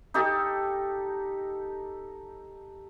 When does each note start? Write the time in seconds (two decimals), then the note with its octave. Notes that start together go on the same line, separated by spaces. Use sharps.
0.14 D#4 G4 A4